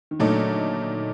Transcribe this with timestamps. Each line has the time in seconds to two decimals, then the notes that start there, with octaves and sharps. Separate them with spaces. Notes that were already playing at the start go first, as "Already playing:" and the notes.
0.11 D#3
0.19 A#2 D3 F#3 A3 D#4
0.43 D3